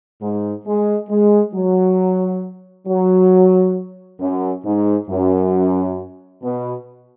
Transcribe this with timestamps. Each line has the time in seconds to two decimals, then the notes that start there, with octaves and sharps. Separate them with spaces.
0.21 G#2
0.66 G#3
1.09 G#3
1.54 F#3
2.87 F#3
4.20 F#2
4.65 G#2
5.10 F#2
6.43 B2